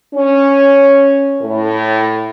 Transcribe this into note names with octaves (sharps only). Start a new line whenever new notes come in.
C#4
A2